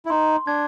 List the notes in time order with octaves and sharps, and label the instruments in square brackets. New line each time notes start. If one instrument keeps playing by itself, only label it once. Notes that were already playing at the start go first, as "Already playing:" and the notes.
[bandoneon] E4
[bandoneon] D#4 [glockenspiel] C6
[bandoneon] D4 [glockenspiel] G#6